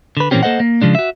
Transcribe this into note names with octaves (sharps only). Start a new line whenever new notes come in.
D3 B4
A#2 E3 A#3 C4 C#4 G4
A#3 A4 C5 D#5 F#5
A#3
C#3 F3 G#3 D4
F#4 E5